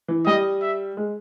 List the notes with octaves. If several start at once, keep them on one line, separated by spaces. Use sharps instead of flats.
E3
G3 D#5
E5
G#3